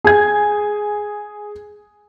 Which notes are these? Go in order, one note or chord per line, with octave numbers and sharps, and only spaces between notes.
G#4 G#5 G#6